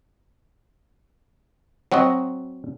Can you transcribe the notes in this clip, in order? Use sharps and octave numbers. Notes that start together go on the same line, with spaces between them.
F#3 C4 F#4 D#5